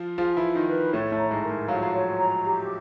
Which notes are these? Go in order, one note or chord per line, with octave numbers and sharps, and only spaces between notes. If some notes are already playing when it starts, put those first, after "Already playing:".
Already playing: F3 F4
F3 F4 G#4
E3 E4
F4
D#3 D#4
B4
A2 A3 C#5
A2 A3
A#5
G#2 G#3
A#4
G#2 G#3
F#3 F5
F3
F#3
C#5
A#5
G4